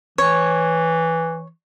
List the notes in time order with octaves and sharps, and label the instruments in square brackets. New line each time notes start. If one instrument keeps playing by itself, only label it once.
[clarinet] E3 [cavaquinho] C#5